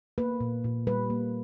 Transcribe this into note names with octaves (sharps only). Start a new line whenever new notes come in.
A#3 B4
A#2
A#2
G3 B4
A#3